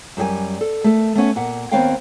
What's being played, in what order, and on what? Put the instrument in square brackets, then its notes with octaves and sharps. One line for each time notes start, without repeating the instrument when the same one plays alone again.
[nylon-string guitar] F#2 G3 G#4 G#5
A4
A3 A4
A3 B3 C#4 F#5
A#2 F#5
D#2 B3 C4 C#5 F5 G5